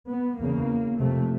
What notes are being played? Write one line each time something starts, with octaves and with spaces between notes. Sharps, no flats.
B3
E2 C#3 A#3
F2 C3 A3